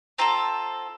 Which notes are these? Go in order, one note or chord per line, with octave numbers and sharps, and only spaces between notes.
C4 F4 A4 A#5